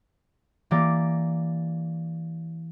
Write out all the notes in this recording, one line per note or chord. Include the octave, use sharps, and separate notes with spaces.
E3 A#3 G4 D5